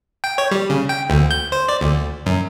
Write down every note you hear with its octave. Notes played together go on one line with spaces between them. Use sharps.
G5
C#5
G3
C#3
G5
D2
G6
C5
D5
D2
F#2